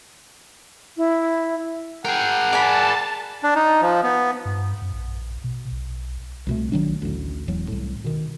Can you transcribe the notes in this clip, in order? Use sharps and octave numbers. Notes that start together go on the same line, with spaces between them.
E4
G#4 A#4 F#5 G5
D5 G#5 A5 B5
D4
D#4
F3
B3
G2
F#2
A#1
B2
B1
C2 B2 A3
A#1 D#3 F#3 D4
A1 D2
E1 E2 F#3
C2 A2
B2 D#3